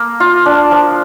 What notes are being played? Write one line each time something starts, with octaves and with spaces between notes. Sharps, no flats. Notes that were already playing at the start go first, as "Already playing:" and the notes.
Already playing: A#3 A#4
F4
D4
F3